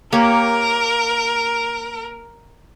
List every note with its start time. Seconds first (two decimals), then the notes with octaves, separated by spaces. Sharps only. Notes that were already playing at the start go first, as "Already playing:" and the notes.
0.13 A#3 G4 A#4 C#5